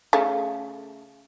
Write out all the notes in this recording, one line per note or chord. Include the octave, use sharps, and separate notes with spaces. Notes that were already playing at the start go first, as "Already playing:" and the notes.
C#3 A3